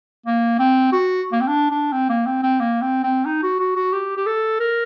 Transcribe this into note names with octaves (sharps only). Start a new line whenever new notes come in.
A#3
C4
F#4
A#3
C4
D4
D4
C4
A#3
C4
C4
A#3
C4
C4
D#4
F#4
F#4
F#4
G4
G4
A4
A#4